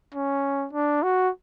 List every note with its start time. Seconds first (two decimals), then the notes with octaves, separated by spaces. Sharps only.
0.15 C#4
0.73 D4
1.03 F#4